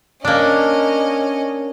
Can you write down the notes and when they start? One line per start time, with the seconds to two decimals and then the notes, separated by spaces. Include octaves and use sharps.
0.25 A#3 C#4 D4 D#5